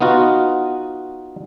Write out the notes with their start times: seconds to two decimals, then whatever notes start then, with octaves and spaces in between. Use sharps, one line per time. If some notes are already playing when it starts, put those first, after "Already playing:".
0.01 B3 D#4 F4 F#4